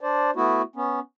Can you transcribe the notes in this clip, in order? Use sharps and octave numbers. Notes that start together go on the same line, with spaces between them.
D4 C5 D5
A3 B3 E4 F#4
B3 C#4